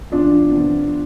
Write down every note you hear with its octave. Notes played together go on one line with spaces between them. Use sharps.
E2 D4 F4
C3 F3 B3